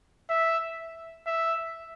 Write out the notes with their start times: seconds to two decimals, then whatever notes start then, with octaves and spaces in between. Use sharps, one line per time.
0.30 E5
1.27 E5